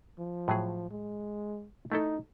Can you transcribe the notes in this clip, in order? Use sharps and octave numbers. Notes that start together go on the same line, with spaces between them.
F3
A2 F#3 G#4
G#3
A3 D#4 E4 A4